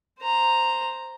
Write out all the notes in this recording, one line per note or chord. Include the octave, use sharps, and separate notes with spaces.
C5 A#5